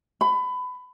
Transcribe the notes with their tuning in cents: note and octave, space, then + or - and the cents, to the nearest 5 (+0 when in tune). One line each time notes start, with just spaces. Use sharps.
B5 +25